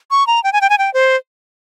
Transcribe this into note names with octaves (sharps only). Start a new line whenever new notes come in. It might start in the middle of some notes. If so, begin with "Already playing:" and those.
C#6
A#5
G5
G#5
G5
G#5
G5
C5